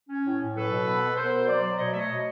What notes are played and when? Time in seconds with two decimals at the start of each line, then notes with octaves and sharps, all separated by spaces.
0.09 C#4
0.24 A2
0.40 A2
0.55 F#3 A4 B4
0.70 B2
0.86 B3
1.01 B3
1.16 B3 A#4 C5
1.31 B2
1.47 F#3 C5 D5
1.63 F#3
1.78 B2 C#5 D#5
1.92 A3 E5
1.98 C#5 D#5
2.09 B2